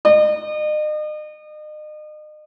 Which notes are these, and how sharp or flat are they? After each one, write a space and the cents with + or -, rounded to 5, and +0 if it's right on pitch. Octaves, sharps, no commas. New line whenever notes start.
D#5 -40